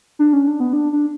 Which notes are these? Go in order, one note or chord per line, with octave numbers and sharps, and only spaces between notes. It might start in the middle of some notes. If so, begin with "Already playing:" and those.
D4
C#4
D4
B3
D4
D4